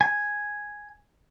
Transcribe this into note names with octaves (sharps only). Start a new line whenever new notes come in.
G#5